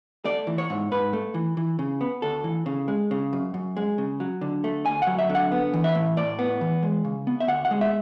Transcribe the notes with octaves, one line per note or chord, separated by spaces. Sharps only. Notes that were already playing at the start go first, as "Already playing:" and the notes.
A3 D5
E3
C#5
G#2
G#2 B4
A3
E3
E3
C#3
B3
D2 A4
E3
C#3
G#3
C#3
F#2
F#2
G#3
C#3
F#3
D3
A3
D2 G#5
F#3 F#5
E5
D3
F#5
B3
E3
E5
A2
A2 D5
B3
E3
G#3
C#3
B3
E5
D2 F#5
F#5
G#3
E5